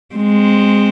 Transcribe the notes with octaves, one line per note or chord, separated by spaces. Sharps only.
G#3 C4